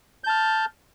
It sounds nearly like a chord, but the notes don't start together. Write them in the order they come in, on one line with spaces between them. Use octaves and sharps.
G6 A5 F6